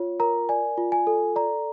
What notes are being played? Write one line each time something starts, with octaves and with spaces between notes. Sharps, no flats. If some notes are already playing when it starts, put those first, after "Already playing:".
Already playing: F4 C#5
A#4 A#5
D5 G#5
F4
G#5
A4
D5 A#5